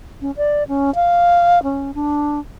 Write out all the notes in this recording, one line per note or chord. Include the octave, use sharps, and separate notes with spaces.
C#4
D5
C#4
F5
C#4
D4